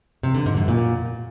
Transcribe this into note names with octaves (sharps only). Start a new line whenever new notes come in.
C3
D3
G#2
F#2
A#2